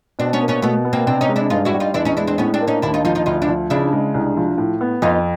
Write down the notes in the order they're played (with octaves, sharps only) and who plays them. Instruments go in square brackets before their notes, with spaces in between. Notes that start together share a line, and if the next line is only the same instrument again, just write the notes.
[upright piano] B2 [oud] C4 D4
[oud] B3 C#4
[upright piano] A#3
[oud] B3 C#4
[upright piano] B2 [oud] A3 B3
[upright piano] B3
[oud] A#3 C4
[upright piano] C3 [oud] C4 D4
[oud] C#4 D#4
[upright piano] G#3
[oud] D4 E4
[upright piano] G2 [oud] D#4 F4
[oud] E4 F#4
[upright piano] G3
[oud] D#4 F4
[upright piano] E2 [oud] D4 E4
[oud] C#4 D#4
[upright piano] G#3 [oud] D4 E4
[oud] C4 D4
[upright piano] A2 [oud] B3 C#4
[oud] C4 D4
[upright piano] A#3
[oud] C#4 D#4
[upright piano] D#2 [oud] D4 E4
[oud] D#4 F4
[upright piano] F3 [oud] D#4 F4
[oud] D#4 F4
[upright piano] D2 [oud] D#4 F4
[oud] D4 E4
[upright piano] F3
[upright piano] C#3 [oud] D4 E4
[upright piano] G#3
C2
F3
A2
B3
[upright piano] F2 [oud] D#4 F4